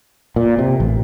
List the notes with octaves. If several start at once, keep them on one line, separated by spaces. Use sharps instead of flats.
A#2
C3
A1